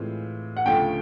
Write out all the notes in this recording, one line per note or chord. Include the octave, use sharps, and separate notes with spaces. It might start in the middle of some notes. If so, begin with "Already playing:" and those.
Already playing: A2 E3 G#3 C4 F4
F#5
D2 C#3 F3 A3 C#4 G5